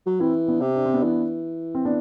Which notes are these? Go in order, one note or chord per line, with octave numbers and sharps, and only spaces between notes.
F#3
E3 C4 E4
B3 D4
C3
D4
C4
B3 D4
E3
C4
B3 D4